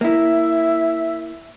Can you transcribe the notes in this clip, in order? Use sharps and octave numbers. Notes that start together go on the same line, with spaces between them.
A#3 E4 E5